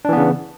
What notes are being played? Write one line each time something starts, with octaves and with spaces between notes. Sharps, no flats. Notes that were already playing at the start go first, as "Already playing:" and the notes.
C#3 E3 B3 D4